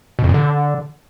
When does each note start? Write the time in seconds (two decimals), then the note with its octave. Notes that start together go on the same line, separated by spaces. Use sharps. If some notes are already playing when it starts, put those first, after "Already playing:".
0.19 B2
0.24 F2
0.29 A#2
0.34 D3